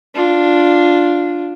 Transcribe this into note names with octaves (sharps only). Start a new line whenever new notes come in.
D4 F4